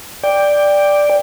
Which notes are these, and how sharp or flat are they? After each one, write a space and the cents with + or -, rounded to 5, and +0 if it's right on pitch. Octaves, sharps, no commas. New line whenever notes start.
D5 +0 G5 +15